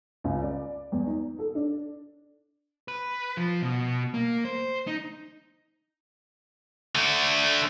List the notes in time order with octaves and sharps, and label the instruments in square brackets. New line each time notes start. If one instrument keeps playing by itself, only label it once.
[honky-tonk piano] C#2
D5
E2
D#4
A4
D4
[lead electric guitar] B4
F3
B2
A#3
C5
D#4
[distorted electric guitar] D3 A3